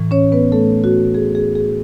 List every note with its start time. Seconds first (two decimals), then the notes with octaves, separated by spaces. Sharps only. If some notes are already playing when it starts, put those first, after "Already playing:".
Already playing: A2 E3
0.11 C#4 C#5
0.32 B3 B4
0.52 A3 A4
0.84 F#4
1.14 G#4
1.35 G#4
1.55 G#4